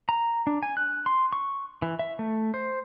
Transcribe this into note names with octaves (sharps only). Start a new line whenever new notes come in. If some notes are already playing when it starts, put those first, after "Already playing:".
A#5
D4
G#5
F#6
C6
C#6
E3
E5
A3
C5